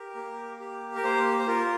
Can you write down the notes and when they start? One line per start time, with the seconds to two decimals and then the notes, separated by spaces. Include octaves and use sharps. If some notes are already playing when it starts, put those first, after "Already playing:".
Already playing: G4 A#4
0.15 A#3
0.60 G4
0.95 A#4
1.04 A#3 C5
1.39 C5
1.48 F4 A#4